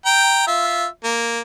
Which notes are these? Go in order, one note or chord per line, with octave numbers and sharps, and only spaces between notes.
G5 A#5
F4 E5
A#3